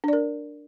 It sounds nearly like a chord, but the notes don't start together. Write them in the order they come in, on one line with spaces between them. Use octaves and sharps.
D4 D5 A#4